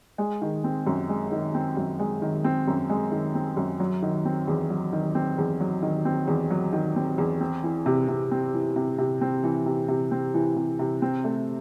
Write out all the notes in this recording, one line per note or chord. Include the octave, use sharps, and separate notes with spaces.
G#3
D#3
C4
F#2
G#3
D#3
C4
F#2
G#3
D#3
C4
F#2
G#3
D#3
C4
F#2
F#3
D#3
C4
E2
F#3
D#3
C4
E2
F#3
D#3
C4
E2
F#3
D#3
C4
E2
C4
E3
C3
C3
C4
E3
C3
C3
C4
E3
C3
C3
C4
E3
C3
C3
C4
A3